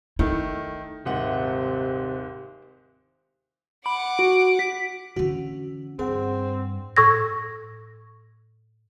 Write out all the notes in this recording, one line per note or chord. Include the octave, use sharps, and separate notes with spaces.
D#3 A3 E4
D#1 G#2 C3 F#5
F#5 B5 D6
F#4
B6
D3 E3 C#4 F#4
G2 C4 G#4 F#5
A2 A4 C#6 E6 G#6 A#6